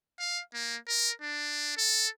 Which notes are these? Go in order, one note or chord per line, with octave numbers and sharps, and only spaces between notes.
F5
A#3
A#4
D4
A4